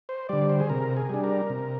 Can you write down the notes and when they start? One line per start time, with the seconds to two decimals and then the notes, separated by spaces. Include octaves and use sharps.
0.09 C5
0.29 D3 G3 D5
0.49 C5
0.60 G#4
0.69 C3 A#4
0.97 G#4
1.09 G3 D4
1.24 A#4
1.50 C3